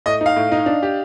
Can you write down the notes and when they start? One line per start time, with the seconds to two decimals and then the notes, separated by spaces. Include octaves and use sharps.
0.06 A2 D#5
0.21 D#4
0.26 F5
0.36 A2
0.52 D#4
0.66 D4
0.83 G4